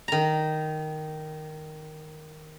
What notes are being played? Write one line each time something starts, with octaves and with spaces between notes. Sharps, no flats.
D#3 A#5